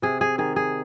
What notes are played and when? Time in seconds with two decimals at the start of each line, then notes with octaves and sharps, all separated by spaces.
0.02 C3 G#4
0.21 G#4
0.38 D#3 G#4
0.56 G#4